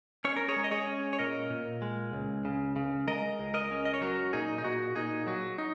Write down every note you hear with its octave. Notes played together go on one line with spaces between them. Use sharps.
C#4 C#5
A#4
G#4 C#5
G#3
D#5
G#4 C#5
C#4
C#5
A#2 A#4 D#5
A#2
G#3
C#2
C#3
C#3
G#3 A#4 D#5
C#2
A#4 D#5
C#4
D#5
C#5
F#3 F#4 A#4
A#2 D#4 G#4
D#4
A#2 F#4
A#2 D#4 G#4
F#3 F#4
D#4